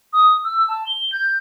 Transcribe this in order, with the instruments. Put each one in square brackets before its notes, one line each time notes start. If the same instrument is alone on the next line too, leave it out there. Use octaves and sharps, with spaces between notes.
[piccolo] D#6
E6
A5
G7
G6